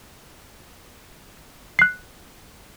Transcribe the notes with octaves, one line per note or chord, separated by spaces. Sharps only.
F#6 C7